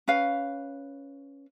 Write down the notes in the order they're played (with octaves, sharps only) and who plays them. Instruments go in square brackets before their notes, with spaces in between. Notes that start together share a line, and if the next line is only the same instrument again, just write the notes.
[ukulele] C#4 B4 F5